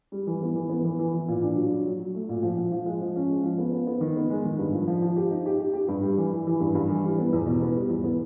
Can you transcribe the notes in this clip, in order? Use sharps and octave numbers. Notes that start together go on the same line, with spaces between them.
G3
E3
B3
E3
B3
E3
E3
E3
A#2
D4
F#3
F#3
F#3
F#3
A3
A#2
F3
F3
F3
G#3
F3
C#4
G#3
F3
B3
B3
B3
D#3
B3
G#3
D#3
G2
F3
F3
F3
G4
D#4
G4
G4
G4
G2
G3
E3
E3
E3
G2
G2
E3
G3
B3
E2
B2
B3
G3
E2
B3